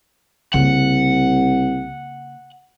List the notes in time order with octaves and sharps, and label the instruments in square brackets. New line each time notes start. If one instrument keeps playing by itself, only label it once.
[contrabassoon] C2 [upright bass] C#3 A#3 [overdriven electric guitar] F#5